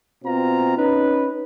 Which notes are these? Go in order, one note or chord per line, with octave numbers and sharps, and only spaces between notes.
B2 C4 F4 A#5
C#4 D#4 B4